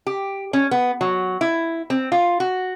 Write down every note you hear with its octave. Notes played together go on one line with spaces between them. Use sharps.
G4
C#4
B3
F#3
E4
C4
F4
F#4